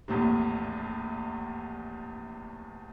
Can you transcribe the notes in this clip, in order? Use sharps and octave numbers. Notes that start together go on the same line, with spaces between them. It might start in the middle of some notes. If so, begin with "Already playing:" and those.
A#1 E2 A2 C3